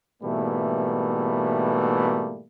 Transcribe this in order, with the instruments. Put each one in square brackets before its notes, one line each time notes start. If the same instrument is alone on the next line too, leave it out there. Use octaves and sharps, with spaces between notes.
[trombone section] G#2 B2 E3 G3 A3 A#3